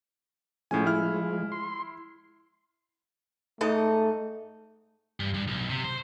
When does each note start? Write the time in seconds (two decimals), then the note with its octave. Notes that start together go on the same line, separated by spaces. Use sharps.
0.71 A2 F3 G#3 C#4 G#5
0.86 E4 F6
1.52 C6
3.61 G#2 A3 D#4 A4
5.20 G2
5.34 G2
5.47 B1
5.70 C3
5.84 C5